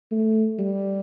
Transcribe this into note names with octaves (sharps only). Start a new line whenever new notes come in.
A3
G3